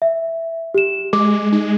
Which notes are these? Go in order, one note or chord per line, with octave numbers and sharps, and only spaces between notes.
E5
G4 E7
G#3 D6
G#3 D#4